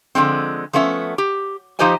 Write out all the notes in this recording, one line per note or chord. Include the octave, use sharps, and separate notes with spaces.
D3 F3 G#3 C4
F3 A3 B3 C#4 E5
G4
F3 D#4 G4 C5 D#5 G#5